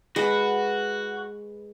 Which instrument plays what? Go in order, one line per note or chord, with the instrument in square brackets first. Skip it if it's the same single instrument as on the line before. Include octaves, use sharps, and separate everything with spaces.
[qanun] G#3 B4 [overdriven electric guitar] F#4